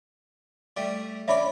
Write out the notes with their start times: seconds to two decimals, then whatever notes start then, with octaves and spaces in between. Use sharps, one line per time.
0.77 G3 A3
1.28 C#4 D4 D5 E5 B5